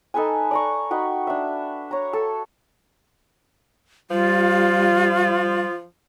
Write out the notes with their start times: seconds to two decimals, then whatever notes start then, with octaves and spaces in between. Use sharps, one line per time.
0.14 D#4 A4 B4 G#5
0.51 D5 A#5 C#6
0.90 D#4 F#4 B4 G5
1.27 D4 E5
1.91 C#5 A#5
2.13 A4
4.11 F3 G3 F4